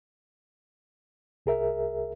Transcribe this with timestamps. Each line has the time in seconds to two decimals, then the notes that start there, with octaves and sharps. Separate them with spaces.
1.46 C2 G#4 A#4 E5